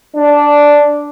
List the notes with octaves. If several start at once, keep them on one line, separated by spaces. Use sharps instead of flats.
D4